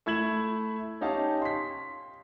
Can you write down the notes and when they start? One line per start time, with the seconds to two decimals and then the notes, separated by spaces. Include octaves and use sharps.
0.06 A3 E4 E5 G#6 E7 F#7
1.01 C#4 D#4 G4 F5 A5
1.42 C6 B6